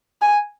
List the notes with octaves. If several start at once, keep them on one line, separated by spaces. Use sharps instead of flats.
G#5